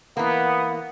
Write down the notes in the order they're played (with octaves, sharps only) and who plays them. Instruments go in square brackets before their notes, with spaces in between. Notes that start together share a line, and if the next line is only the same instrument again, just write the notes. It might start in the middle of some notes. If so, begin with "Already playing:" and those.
[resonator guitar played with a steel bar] E3 A#3 [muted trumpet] B3 [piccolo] F#5